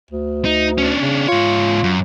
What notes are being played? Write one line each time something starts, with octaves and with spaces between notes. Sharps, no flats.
D2
D#4
C#4 D4
C#3
G#2 F4 C#5
F#2